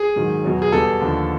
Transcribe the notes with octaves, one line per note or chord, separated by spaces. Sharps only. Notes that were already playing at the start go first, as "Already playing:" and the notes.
Already playing: G#4
G#2 D#3 F#3
E2 B2 F#3
G#4
E2 B2 G3 A4
D#2 D3 F3